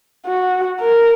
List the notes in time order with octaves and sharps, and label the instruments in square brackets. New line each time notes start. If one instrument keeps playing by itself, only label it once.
[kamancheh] F#4
A#4